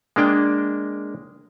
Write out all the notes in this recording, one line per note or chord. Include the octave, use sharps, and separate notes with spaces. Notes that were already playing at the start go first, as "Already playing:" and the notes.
G#3 A#3 D4 G5